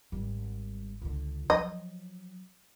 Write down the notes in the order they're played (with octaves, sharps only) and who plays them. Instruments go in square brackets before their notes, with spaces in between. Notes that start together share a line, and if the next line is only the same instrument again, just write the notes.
[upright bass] G#1 G3
C#2 D3
[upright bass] F3 F#3 [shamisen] D#5